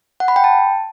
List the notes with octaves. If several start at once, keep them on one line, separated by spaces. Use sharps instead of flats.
F#5
B5
G5
A5